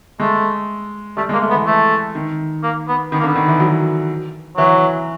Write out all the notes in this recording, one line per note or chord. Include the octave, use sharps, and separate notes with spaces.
G#3 A3
G3 A3
G#3
A#3
A3
B3
E3
A3
D#3
A#3
B3
D#3 B3
A#3
D3
B3
D#3
E3
F#3
E3 F#3